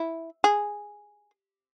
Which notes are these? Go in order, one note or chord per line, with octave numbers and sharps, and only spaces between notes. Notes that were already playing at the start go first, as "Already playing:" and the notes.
Already playing: E4
G#4